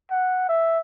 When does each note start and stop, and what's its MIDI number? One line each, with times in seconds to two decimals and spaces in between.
0.11 0.47 78
0.49 0.79 76